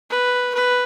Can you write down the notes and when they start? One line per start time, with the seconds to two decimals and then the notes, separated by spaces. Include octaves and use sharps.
0.10 B4
0.54 B4